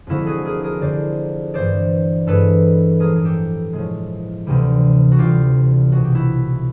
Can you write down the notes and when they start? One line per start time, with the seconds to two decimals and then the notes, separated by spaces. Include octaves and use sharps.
0.07 F2 D3 F3 G#3 E4 F#4
0.26 F#4 G#4
0.45 G#4 A#4
0.63 G#4 A#4
0.81 F2 D3 F3 G#3 C5 D5
1.54 G2 E3 G#3 C5 D5
2.27 G2 E3 G#3 A4 B4
3.00 A2 F3 G#3 G#4 A#4
3.16 G#4
3.24 G4 A4
3.73 A2 F3 G#3
4.46 D2 C3 E3 G3
5.12 F#4
5.18 D2 C3 E3 G3 F4 G4
5.92 C2 B2 G#3 F#4
6.04 G4
6.15 E4 F#4